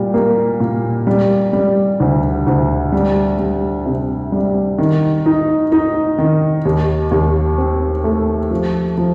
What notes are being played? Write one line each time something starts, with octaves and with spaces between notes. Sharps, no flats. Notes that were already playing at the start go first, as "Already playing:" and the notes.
Already playing: A#2 G3
A#3
A#2
G3
G3
D2
D2
G3
G3
C3
G3
D#3
D#4
D#4
D#3
D#2
D#2
C4
A3
F3
F3